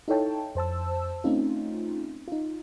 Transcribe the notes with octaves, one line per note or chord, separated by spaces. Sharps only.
D#4 E4 A4 C#5 G5 A5
F2 C5 A5 E6
A3 C4 C#4 D#4 F4
D#4 F4